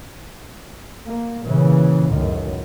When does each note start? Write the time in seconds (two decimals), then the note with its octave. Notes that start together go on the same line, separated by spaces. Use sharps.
1.07 A#3
1.45 A#2 C#3 E3
2.10 C#2 F#2 A2 D#3